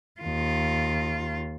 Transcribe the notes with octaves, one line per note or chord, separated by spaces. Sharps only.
D#2 F4